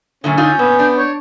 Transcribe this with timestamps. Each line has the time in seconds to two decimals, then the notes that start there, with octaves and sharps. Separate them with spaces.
0.24 F#2 A#2 D3 C#4 E5
0.37 D3 D#4 F4 G6
0.59 A#2 B3
0.79 D4
0.97 C#5